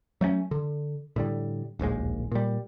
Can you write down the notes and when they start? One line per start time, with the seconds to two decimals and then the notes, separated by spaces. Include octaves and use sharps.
0.21 F#3 A3 A#3 C#4
0.51 D3
1.16 A2 D3 G3
1.79 D1 A#1 D#2 G#3
2.31 A#2 G3